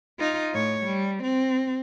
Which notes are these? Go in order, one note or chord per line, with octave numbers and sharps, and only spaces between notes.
D#4 F4
A2 C#5
G3
C4